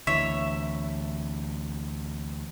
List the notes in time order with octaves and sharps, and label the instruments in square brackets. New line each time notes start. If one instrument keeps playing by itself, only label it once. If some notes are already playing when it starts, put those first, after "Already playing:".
[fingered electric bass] D2 E3 [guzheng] C#5 E5